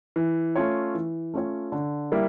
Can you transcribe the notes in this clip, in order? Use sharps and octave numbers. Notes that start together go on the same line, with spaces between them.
E3
A3 C#4 F4 C#5
E3
A3 C#4 F4 C#5
D3
G3 A#3 E4